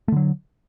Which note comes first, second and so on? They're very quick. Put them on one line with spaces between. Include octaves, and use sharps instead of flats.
A3 D3 F#3